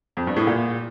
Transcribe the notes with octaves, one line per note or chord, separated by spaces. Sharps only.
F2
G2
A2
A#2